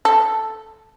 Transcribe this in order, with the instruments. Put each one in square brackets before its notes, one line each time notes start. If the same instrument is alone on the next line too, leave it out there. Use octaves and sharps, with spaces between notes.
[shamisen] A4